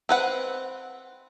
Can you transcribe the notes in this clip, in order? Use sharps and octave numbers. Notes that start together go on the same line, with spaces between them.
C4 B4 F#5